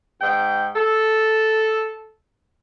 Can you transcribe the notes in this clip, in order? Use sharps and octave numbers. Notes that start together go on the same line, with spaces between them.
G#2 G5
A4